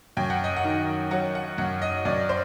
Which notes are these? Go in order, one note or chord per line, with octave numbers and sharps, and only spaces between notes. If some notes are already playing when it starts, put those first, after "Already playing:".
F#2 G5
F#5
D#5
F#5
D#3
F#3 F#5
F#5
F#2 F#5
D#5
F#2 D5
C5